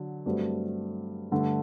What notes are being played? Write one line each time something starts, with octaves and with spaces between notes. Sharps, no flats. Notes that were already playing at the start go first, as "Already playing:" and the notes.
Already playing: D3 F#3
G2 F#3 A3 C4
G2 D3 A3